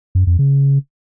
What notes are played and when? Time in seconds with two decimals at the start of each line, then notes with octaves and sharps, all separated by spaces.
0.15 F#2
0.27 F2
0.39 C#3